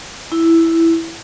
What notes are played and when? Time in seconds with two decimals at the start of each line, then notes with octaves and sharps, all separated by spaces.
0.32 E4